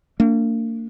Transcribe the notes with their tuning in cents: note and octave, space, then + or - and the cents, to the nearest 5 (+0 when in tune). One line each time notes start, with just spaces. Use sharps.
A#3 -40 D4 -25